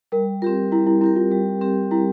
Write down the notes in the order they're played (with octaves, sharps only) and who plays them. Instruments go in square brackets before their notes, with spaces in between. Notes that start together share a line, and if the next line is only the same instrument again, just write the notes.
[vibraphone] G3 [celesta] A#4
[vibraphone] C4 G4 A#4 [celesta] F4
[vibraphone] G3 [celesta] E4
[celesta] E4
[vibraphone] C4 G4 A#4 [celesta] E4
[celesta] F4
[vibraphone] G3
C4 G4 A#4
[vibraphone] G3 [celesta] E4